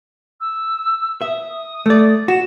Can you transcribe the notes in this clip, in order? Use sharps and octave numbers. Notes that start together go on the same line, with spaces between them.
E6
E5 D#6
A3 D5
F#4 E7